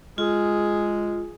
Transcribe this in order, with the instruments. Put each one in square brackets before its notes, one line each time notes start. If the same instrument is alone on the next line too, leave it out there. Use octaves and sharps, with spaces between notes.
[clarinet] G#3 [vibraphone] F4 [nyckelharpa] G#4